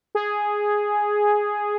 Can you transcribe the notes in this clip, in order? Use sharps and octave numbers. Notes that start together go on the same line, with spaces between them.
G#4